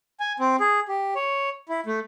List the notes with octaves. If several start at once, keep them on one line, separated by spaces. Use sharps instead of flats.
G#5
C4
G#4
G4
C#5
E4
A3